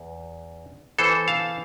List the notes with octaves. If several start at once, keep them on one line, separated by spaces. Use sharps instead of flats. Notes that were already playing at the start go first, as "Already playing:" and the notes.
Already playing: E2
E3 B3 E4 A4 C5
F5 A5